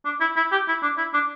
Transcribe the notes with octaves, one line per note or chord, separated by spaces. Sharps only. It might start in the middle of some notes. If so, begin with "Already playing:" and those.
D4
E4
E4
G4
E4
D4
E4
D4